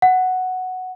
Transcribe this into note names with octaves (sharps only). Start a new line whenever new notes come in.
F#5